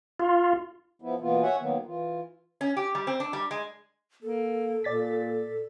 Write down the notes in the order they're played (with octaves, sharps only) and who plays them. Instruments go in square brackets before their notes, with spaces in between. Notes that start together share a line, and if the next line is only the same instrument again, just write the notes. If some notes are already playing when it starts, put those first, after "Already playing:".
[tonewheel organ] F4
[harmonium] F3 B3 E4
B2 E3 A#3 B3 F4
C#5 E5 F#5 G#5
D#3 F#3 A#3 B3
E3 F4
[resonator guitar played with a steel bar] C#4
G4
G3
C4
D4
G3
G#3
[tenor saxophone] A#3 [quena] A4
[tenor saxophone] A#2 [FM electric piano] D5 A6 B6